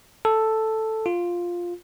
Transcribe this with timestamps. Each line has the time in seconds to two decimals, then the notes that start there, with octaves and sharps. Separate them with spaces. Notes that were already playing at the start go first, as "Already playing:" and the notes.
0.25 A4
1.06 F4